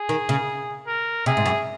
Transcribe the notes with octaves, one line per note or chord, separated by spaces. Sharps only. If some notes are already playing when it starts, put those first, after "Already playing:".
Already playing: G#4
D#3
C#3
A#4
C3 G#4
G#2
F#2